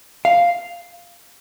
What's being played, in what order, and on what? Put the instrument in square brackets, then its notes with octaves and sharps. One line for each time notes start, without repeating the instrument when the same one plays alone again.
[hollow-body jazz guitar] F5